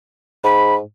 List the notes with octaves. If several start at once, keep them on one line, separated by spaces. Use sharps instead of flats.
G#2 B5